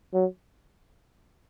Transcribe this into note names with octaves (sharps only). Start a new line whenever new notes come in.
F#3